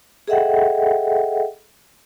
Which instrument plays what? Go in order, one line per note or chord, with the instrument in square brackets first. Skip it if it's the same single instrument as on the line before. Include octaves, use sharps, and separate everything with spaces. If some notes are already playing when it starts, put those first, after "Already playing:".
[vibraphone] G#4 A4 D#5 E5 F#5 G5